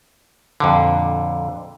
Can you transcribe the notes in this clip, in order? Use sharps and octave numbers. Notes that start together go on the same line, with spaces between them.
F2 A#2 D3